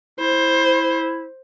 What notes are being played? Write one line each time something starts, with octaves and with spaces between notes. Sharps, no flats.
E4 C5